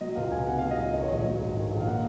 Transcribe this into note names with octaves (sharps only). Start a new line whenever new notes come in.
F#3 D#5
C#2 F5
C#2 G#5
C3 F#5
F#3 F5
D#5
C#2
D#3 D#5
C#5
A#1 D#5
F#3
G#2
D#3
A#1
F5
A#3 F#5